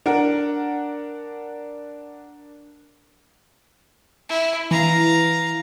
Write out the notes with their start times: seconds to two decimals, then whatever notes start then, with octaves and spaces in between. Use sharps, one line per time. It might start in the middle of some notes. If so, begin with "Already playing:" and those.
0.06 D4 A#4 F#5
4.29 E4
4.71 E3 F5 A#5